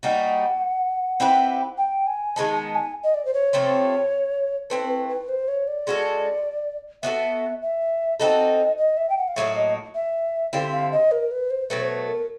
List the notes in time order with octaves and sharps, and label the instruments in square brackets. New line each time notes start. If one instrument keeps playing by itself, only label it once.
[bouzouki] G3 A#3 D#4 F#4 [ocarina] F#5
[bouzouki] C4 E4 G4 B4
[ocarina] G5
G#5
[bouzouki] D#3 G#3 B3 D#4 [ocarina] A5
[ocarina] A5
G#5
D#5
D5
C5
C#5
[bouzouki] C3 F3 A3 C4
[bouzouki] A3 C4 E4 [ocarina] B4
[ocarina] B4
B4
C5
C#5
D5
[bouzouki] G#3 C#4 F#4 A4
[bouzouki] B3 D4 F#4 A4 [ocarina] E5
[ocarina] E5
[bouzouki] C4 D#4 F#4 A4 [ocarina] D#5
[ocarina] D#5
E5
G5
F#5
F5
[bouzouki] A2 F#3 A#3 D#4 [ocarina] E5
[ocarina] D#5
E5
[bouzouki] D3 G3 C4 E4 [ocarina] F5
[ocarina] F5
D#5
A#4
B4
C5
[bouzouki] B2 F#3 A3 [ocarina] B4
[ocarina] C5
B4
A#4